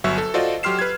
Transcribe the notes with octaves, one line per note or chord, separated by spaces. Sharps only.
G1 F#3 E5 C#6 E6
A4
F4 F#4 A4 C5 D5 D#5
F#3 G4 C6 F6 C7 E7
B4 G#6